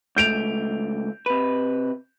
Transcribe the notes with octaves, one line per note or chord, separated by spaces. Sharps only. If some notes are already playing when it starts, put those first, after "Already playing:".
C#2 A3 G6 D7 F7
C3 B4